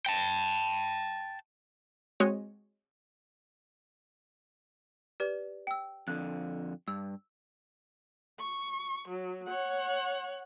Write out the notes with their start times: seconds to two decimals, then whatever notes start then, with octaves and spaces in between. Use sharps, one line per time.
0.06 G5 A5
2.20 G#3 C4 F#4 C#5 D#5
5.20 G4 B4 D5
5.67 G5 E6
6.08 F2 D3 F#6
6.88 G2 E6
8.39 C#6
9.08 F#3
9.47 C#5 F#5